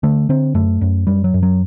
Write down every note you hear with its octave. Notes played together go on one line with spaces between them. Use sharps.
D3 A3
D3 C4
F#2 A3
F#2
F#2 G3
F#3
F#2
F#3